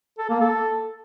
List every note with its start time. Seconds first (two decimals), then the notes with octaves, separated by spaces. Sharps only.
0.18 A4
0.30 A#3
0.41 A4